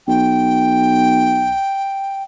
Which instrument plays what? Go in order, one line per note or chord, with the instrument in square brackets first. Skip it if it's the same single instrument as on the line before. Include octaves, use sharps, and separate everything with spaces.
[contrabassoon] B1 [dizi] G5